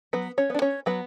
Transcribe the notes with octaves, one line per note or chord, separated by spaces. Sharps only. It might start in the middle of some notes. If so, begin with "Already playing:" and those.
F#3 B3 B4
C#4 C#5
B3 D4
C#4 C#5
F#3 B3 B4